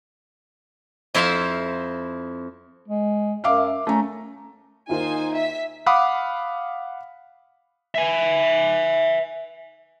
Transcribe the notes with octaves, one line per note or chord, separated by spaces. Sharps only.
F2 E4 C5 E5 F5
G#3
F#2 E5 F5 D6
A3 C#4 A#5
D#2 D#4 F4 A#4 C5 G#5
E5 B6
F5 F#5 B5 D6 D#6
E5 G#5